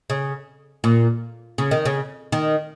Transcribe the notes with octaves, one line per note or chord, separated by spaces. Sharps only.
C#3
A#2
C#3
D#3
C#3
D#3